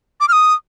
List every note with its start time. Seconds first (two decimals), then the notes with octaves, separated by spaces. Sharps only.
0.21 D6
0.28 F6
0.33 D#6